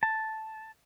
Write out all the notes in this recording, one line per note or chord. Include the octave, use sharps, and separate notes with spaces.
A5